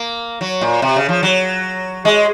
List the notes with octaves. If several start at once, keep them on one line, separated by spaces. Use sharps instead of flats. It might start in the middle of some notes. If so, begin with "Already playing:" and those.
Already playing: A#3
F#3
A#2
C3
C#3
F3
F#3
G#3